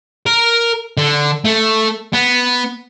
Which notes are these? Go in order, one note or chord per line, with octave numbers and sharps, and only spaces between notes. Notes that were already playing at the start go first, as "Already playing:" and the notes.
A#4
D3
A3
B3